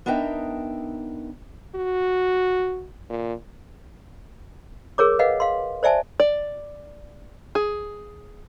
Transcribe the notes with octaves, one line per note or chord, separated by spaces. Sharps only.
B3 D4 D#4 A#4 E5 G5
F#4
A#2
G#4 A#4 C#5 D6
B4 D#5 F5 F#5
F5 C6
C5 D5 E5 G#5 A5
D5
G#4